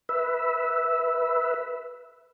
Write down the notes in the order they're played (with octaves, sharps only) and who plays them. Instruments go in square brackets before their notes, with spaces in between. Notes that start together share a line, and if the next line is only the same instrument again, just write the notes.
[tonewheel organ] B4 E5